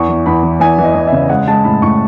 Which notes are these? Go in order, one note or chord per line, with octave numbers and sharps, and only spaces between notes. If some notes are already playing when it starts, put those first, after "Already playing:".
Already playing: E2 C#6
E3
E2 B5
E3
E2 G#5
E3
D#5
E2
C#3 E5
G#3 F#5
G#3 A5
A2 B5
A2 C#6